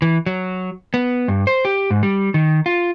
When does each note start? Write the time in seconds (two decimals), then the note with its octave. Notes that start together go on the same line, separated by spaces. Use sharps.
0.02 E3
0.26 F#3
0.94 B3
1.28 G2
1.47 C5
1.65 G4
1.91 G#2
2.03 G3
2.34 D#3
2.66 F4